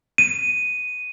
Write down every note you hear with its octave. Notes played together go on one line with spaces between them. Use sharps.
D#7